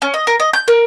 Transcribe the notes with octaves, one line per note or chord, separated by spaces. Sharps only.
C#4
D#5
A#4
D#5
G6
A#4